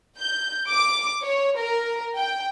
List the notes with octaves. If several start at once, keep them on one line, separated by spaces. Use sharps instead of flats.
G6
D6
C#5
A#4
G5